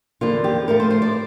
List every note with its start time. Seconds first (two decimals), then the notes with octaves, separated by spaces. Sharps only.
0.21 E2 D3 F3 A#3 F4
0.44 G4
0.67 A2 F3 A3 A#4
0.80 C5
0.90 C5
1.02 D5